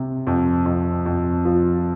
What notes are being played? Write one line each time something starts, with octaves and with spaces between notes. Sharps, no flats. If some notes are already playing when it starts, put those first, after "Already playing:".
Already playing: C3
F2
F2
F2
F3